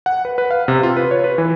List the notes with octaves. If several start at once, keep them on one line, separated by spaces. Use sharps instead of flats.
F#5
B4
B4
F5
C3
F4
B4
C#5
B4
E3